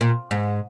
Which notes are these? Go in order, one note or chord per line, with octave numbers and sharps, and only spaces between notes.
A#2
G#2